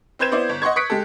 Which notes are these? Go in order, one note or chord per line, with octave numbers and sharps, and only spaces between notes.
C4 B4 C5 G6 G#6 E7
B3 E4 C5 D5
G1
D#5 F#5 C6 C#6 G#6
C#6 D#6 F#6 B6 C#7 D7
G#3 G4 A4